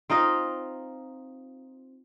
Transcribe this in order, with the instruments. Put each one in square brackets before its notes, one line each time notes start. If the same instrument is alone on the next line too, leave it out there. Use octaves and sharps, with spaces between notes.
[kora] C4 D#4 F4 D#5